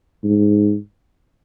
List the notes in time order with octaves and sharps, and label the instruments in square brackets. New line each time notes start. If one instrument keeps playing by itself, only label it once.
[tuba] G#2